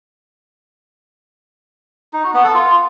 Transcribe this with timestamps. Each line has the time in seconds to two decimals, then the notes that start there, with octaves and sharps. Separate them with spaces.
2.13 D#4
2.24 F#4
2.34 B3
2.44 A4
2.54 F4